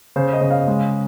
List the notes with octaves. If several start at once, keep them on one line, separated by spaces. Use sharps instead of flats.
C#3 C5
D#5
C#3
F5
G#3